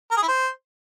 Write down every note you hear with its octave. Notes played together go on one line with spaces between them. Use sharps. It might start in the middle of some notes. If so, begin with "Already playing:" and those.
A#4
G#4
E4
C5